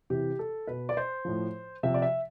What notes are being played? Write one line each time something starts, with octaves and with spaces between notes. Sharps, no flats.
C3 E3 G4
A4
B2 B4
D5
C5
A2 F3
C3 F3 E5
D5
E5